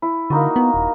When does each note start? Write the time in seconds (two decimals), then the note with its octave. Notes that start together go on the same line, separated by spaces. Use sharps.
0.02 E4
0.30 D3 A#3 D#4 F#4
0.56 B3
0.74 D#1